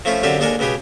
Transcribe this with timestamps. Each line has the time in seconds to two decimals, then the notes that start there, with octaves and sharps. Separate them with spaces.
0.05 F3 A3 C#4 E4 F4
0.23 F#2 D3 C4 F4 G4 E5
0.39 D#2 G#3 D4 A4 A#4 G#5
0.59 C#2 B2 B3 G4 G#4